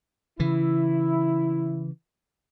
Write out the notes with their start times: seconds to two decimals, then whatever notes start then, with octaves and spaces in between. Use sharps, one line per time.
0.40 C#3 E3 E4